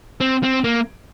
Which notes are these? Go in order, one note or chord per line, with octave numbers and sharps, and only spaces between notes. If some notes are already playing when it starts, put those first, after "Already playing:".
C4
C4
A#3